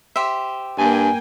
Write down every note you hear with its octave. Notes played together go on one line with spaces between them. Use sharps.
G4 C5 E5
G2 A#3 G5 G#5